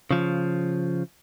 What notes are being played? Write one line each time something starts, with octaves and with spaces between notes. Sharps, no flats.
C#3 F3